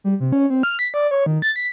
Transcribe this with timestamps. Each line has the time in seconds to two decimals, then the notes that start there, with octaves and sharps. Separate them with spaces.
0.04 G3
0.20 C3
0.32 C#4
0.50 C4
0.63 F6
0.79 B6
0.94 D5
1.11 C#5
1.26 D#3
1.42 A6
1.56 B6